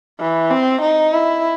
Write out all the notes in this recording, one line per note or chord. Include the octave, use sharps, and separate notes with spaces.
E3
C4
D#4
E4